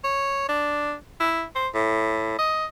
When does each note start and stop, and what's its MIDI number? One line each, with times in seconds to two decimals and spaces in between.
0.04 0.46 73
0.49 0.94 62
1.20 1.44 64
1.56 1.68 72
1.74 2.36 45
2.39 2.66 75